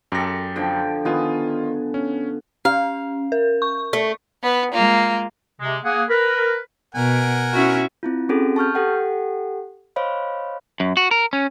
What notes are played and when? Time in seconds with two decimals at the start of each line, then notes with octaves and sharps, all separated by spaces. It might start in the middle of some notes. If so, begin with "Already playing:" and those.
0.12 F#2 G4 A4 A#6
0.56 D3 F3 G5
1.05 D#3 B3 F4 G#5
1.94 C#4
2.65 C#4 F5
3.32 A#4
3.62 C#6
3.93 A3
4.42 B3 B4
4.72 G#3 A#3 F4
5.60 C3 G#3
5.84 A#3 G#4 F#5
6.09 A#4 B4
6.95 B2 A#4 F#5 G#5
7.52 C#4 E4 F#4
8.03 C4 E4 F4
8.29 C4 C#4 F#4 G#4 A4
8.56 A5 C#6 F6 G6
8.74 G4 A4 F#5 G5
9.96 C5 C#5 D#5 F5 B5
10.80 F#2
10.97 F#4
11.11 A#4
11.33 C#4